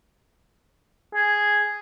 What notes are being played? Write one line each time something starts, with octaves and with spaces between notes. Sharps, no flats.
G#4